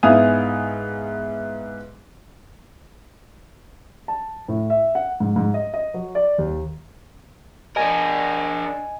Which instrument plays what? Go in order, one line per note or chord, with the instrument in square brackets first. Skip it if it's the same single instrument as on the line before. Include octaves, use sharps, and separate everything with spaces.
[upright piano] G#2 B3 E4 F5 G#5 D#6
[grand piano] A5
A2
E5
F#5
G#2
G#2
D#5
D#5
F#3
D5
D#2
[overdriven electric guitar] D4 A#4 [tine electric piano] D#5 G#5